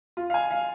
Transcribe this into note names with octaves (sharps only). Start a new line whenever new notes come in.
F4
F5
G#5
F5